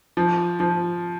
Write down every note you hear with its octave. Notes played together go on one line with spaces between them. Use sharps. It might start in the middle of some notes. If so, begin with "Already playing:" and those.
F3
F3